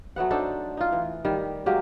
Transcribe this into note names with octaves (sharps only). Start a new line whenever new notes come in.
F#3 A3 B3 F#5
D4 D#4 A4 C5
D#4 F4
E3
D#3 G3
F#3 G#3 A#3 G4